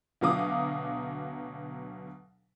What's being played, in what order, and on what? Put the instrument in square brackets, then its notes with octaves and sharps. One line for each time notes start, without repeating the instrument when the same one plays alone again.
[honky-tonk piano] D2 B2 F#3 F5 D6 D#6